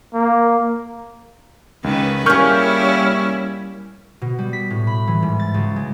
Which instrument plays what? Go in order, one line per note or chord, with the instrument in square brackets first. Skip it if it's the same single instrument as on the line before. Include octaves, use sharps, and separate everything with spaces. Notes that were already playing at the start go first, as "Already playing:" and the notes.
[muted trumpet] A#3
[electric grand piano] C#2 [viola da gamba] D#3 C#4 B4
[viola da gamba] G3 E4 [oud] A#3 G#4 [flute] C#4 [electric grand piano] C#6 F6 G6
[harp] B2
G3
B6
A2
B5
E3
G#2
A6
C#2
G#3